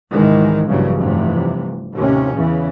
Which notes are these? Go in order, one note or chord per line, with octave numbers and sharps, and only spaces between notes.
C2 G#2 D#3 E3 G#3
A#1 G2 C#3 E3 F#3
F1 G2 C3 E3
D#2 A2 C3 C#4
E2 C#3 E3